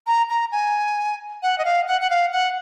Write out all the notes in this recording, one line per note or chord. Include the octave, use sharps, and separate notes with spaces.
A#5
A#5
G#5
F#5
D#5
F5
F#5
F#5
F5
F#5